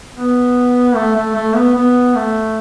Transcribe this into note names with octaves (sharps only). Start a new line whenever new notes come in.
B3
A3
A3
A3
B3
B3
A3